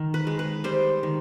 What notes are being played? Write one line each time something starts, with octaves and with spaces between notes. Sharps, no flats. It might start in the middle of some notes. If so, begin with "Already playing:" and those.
Already playing: D#3
B4
G#3
B4
G3 C5
D#3